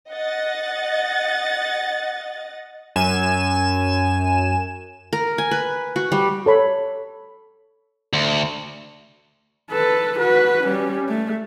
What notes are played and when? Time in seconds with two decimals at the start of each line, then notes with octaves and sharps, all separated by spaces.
0.11 D#5 F#5 A6
2.96 F#2 G#5 E7
5.13 A#4
5.38 G#5
5.51 B4
5.96 F#4
6.12 G3
6.46 A4 C#5 B5
8.13 D2
9.71 A4 B4
10.18 F#4 B4
10.64 G3 C#4
11.09 A3